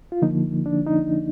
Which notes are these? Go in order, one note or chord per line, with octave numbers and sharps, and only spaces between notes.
F4
D3 F3 A#3 D#4
D4
D#4